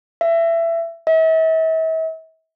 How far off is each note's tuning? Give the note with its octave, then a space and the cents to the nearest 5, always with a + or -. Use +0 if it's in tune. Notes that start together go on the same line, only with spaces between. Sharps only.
E5 +20
E5 -40